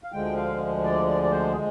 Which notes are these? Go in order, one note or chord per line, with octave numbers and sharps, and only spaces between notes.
F5
D2 D3 F3 G#3 G5
F5
D5
D5
D5
C5
G#4
G#3